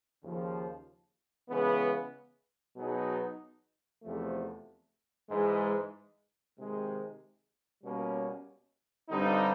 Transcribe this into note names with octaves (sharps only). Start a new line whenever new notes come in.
D#2 C#3 F3
C#3 E3 G#3 B3
B2 F#3 B3 D#4 G#4
E2 C3 F3 A3
G#2 E3 G#3
C3 D#3 G#3
B2 G3 A#3 C#4
G2 D3 G3 C4 D#4